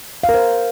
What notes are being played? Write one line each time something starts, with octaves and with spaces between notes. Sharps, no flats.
F5
A#4
C5